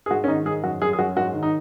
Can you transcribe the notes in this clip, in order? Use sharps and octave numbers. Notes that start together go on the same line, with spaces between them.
G#4
G#2 F#4
C#4
D#3 D#4
G#2 G#4
F#2 F#4
F#2 G#4
G#4
F#2 F#4
G#2 F#4
D#3
D#4